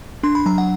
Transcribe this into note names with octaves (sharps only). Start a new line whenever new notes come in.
D4 C6
B5
F#3 A#5
F#5